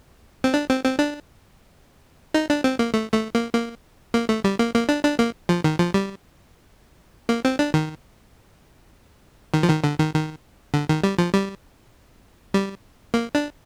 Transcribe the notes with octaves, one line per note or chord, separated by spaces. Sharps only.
C4
D4
C4
C4
D4
D#4
D4
C4
A#3
A3
A3
A#3
A#3
A#3
A3
G3
A#3
A#3
D4
D4
A#3
F3
D#3
F3
G3
A#3
C4
D4
D#3
D#3
F3
D#3
D3
D#3
D#3
D3
D#3
G3
F3
G3
G3
A#3
D4